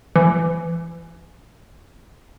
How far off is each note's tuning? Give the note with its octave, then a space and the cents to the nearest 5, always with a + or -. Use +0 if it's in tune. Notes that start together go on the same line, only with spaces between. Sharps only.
E3 +35